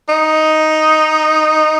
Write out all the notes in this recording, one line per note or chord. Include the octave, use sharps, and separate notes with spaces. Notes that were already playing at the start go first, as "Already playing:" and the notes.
D#4